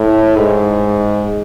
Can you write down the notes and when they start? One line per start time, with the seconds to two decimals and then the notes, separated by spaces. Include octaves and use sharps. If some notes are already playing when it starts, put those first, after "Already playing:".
Already playing: A2
0.36 G#2